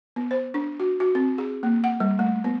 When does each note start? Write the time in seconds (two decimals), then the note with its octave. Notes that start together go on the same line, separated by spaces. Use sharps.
0.16 B3
0.31 C5
0.54 D4
0.80 F#4
1.00 F#4
1.15 C4
1.38 G#4
1.63 A#3
1.84 F#5
2.00 G3
2.19 A3
2.44 B3